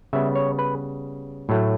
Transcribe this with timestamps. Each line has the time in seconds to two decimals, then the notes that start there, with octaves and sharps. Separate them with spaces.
0.13 C#3 G3 B3 E5
0.35 C#5
0.59 B4
1.49 A2 F#3 A3